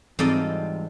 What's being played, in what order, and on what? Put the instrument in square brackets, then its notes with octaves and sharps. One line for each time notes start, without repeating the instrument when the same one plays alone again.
[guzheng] G#2 D5 D#5 [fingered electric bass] E3 G3 [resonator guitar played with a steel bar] C4 F4 A4